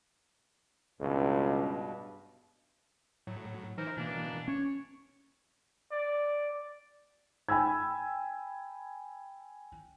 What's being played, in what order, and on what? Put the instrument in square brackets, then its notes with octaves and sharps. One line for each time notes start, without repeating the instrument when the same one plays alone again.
[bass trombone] C#2 [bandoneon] G2 B2
[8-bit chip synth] A2 F#3
[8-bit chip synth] E3 D#4 C5 [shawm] A#4
[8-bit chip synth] B2 E3 A#3 [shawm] D4
[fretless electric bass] C#4 [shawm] C#5
[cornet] D5
[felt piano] G5 G#5 B5 E6 G#6